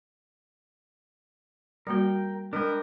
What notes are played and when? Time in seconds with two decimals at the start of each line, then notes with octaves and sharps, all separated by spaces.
1.87 G3 A#3 F#4 A#4 G5
2.53 G#3 D4 A#4 B4 G5